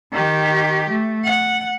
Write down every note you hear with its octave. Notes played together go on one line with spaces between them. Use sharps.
D#3 G4
A3
F#5